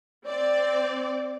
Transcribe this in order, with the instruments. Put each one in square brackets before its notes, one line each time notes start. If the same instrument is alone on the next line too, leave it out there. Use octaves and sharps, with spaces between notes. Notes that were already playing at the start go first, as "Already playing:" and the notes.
[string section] C4 D5